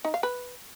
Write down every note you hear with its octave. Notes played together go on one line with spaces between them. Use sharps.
D#4
F5
B4